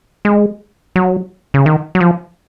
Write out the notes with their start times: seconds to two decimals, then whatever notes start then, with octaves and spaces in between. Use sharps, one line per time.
0.25 G#3
0.96 F#3
1.54 C#3
1.66 D#3
1.95 F#3
2.01 F3